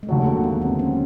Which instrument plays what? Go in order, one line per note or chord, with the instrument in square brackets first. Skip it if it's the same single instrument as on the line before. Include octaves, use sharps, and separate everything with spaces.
[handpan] G#3
[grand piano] D#2 D3 F#3 [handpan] A3
[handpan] A#3
B3
C4
C#4